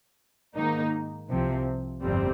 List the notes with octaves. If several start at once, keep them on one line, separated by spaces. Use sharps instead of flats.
G#2 D#3 A#3 D#4
C2 C3 F3 C4
G1 F2 C3 G3 C4